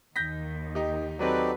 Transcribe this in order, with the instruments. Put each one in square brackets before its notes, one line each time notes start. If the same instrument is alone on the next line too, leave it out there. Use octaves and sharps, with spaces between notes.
[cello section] D#2 D#3 [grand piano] G6 A#6 B6
[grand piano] D#4 G4
[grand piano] F#3 C4 [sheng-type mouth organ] D#4 G4 D5 [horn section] F#4 A4 B4